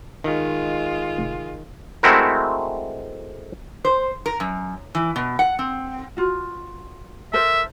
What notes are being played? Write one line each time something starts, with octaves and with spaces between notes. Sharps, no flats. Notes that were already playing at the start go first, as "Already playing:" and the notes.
D#3 G#3 F4
F1
G#3 A3 C4 E4 F#4 A#4
C5
A#4
F#2
E3
B2
F#5
C4
F4 F#4
A4 A#4 C5 E5